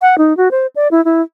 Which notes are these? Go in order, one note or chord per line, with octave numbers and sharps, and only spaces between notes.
F#5
D#4
F#4
C5
D5
E4
E4